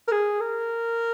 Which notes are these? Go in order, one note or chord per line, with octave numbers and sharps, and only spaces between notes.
A#4
G#4
A#4